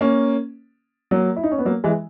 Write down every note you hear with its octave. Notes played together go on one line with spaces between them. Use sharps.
A#3 C#4
F#3 A#3
E4
D#4
C#4
B3
F#3 A#3
E3 G#3